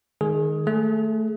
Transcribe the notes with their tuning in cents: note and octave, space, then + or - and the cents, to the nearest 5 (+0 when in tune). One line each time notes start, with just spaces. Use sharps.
D#3 -15 G#3 +0 G#4 +15
A3 +0 G#4 +25